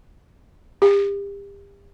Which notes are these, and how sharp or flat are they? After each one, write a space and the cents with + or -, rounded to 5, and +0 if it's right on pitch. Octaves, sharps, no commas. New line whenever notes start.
G4 +35